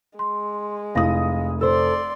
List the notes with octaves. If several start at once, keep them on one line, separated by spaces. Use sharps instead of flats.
G#3 C6
F1 E4 F5 D#6 A#6
A4 C5 D5 C6 E6